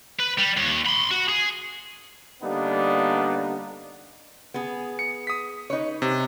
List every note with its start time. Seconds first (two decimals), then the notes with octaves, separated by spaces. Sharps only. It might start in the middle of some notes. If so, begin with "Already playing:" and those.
0.20 B4
0.38 G3
0.57 D#2
0.86 B5 C6
1.11 F#4
1.29 G#4
2.42 D3 G3 A#3 B3 D4 D#4
4.54 B3 G#4
4.99 C#7
5.27 D#6 B6
5.70 D#4 B4 C#5
6.02 C3